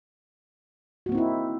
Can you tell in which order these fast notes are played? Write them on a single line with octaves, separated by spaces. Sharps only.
F#4 A#3 C4 D#4 E4